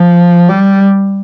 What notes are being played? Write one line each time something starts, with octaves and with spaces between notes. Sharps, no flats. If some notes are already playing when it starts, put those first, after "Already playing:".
Already playing: F3
G3